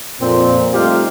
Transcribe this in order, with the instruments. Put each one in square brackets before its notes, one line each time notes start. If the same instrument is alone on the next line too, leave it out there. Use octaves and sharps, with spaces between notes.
[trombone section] F2 A#2 C4
G3 A3 C4 D#4 F4 G4